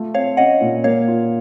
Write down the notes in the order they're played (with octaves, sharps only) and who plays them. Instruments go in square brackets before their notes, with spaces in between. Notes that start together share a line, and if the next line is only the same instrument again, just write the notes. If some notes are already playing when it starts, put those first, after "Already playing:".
Already playing: [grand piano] A3 F4
[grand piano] C4 [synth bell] C#5 F5
[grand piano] C#4 [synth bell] D#5 F#5
[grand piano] A#2
[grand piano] A#3 [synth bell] C#5 F5
[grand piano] F4